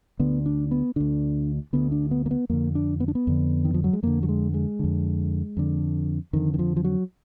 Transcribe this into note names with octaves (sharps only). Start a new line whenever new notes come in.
D2 D3 B3
D4
B3
D2 D3 D4
D2 D3 B3
D4
B3
A#3
B3
F2 D3 A#3
D4
B3
D4
B3
F2 D3
D#3
F3
F#3
G#3
F2 D3 A#3
F#3
G#3
G#3
F2 D3
F2 D3
F2 D3 D#3
D#3
F3
F3
F#3